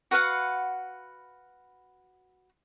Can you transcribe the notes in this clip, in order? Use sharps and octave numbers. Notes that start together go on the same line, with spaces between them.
F#4 B4 F5 F#5